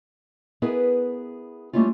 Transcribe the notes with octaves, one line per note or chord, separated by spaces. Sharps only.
B3 E4 G#4 A#4 B4
G3 A3 A#3 C#4 E4 F4